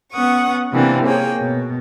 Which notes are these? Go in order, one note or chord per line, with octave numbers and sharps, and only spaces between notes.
B3 C#4 F#5 C#6 D#6
C3 E3 A#3 C4 D4
A#3 G#4 C#5 G5
B2